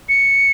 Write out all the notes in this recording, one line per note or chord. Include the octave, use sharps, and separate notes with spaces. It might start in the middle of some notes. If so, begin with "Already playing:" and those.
C#7